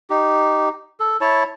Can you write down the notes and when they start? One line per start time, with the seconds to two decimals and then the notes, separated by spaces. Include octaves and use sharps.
0.10 D#4 G4
1.00 A4
1.21 E4 C#5 A5